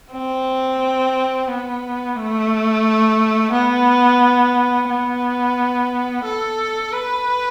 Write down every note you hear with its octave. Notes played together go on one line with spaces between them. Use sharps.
C4
B3
A3
B3
B3
A4
B4